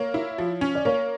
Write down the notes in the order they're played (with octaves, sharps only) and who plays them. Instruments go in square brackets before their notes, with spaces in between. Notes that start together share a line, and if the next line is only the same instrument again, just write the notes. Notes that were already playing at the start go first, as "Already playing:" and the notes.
Already playing: [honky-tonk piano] A#3 [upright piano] C#5
[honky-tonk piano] E4
F3
C#4
[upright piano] D5
[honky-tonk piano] A#3 [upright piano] C#5